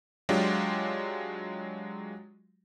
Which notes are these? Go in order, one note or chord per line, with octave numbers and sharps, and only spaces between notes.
F#3 G#3 D4 F4 G4